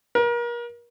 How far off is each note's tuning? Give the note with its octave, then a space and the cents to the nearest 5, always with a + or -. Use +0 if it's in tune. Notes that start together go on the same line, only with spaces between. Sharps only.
A#4 +35